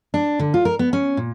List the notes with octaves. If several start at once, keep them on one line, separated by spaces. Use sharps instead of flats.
D4
D3
F4
A#4
B3
C#4
A#2